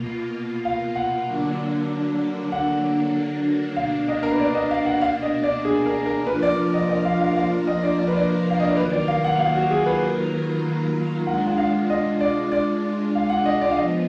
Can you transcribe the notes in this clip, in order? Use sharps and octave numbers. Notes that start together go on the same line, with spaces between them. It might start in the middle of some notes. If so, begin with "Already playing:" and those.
Already playing: B2 A#3 F4
F5
F#5
D3 F#3 A#3 D4
F#5
B2 A#3 D4 F5
D#5
A#4
B4
D5
D#5
F5
F#5
F5
D#5
D5
G#4
A#4
A#4
F3 A#3 D4 F4 A#4 B4
D5
D#5
D#5
F5
F5
F5
D#5
D5
D5
B4
D5
F5
D#5
D5
D#3 F#3 A#3 F4 A#4 B4
D5
F5
F#5
F5
F#4
G#4
B4
G#3 D4 F4 F#5
F#5
F5
D#5
D5
D5
F5
F#5
D#5
D5
F5
F3 B3 D#5